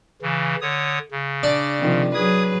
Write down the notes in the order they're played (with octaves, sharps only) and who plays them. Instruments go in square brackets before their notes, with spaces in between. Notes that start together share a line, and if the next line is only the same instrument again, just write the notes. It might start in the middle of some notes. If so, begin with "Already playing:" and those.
[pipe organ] C#3 E3
D3 C#5 D#6
C#3
[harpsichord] D4
[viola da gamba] C3 D#3 F3
[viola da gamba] F#3 G#4 B4 [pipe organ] D#6 G#6